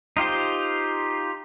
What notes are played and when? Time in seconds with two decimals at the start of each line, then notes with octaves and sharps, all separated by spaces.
0.17 D#4 F4 G4 C5